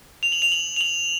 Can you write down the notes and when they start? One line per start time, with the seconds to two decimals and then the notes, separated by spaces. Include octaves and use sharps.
0.23 F7
0.32 F#7
0.42 F7
0.52 F#7
0.76 F7
0.81 F#7